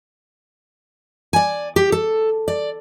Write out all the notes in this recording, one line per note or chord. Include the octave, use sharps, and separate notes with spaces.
D5 G#5
G4
A4
D5